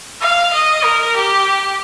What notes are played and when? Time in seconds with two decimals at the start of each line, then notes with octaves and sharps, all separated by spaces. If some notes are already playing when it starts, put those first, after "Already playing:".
0.21 F5
0.53 D#5
0.84 A#4
1.16 G4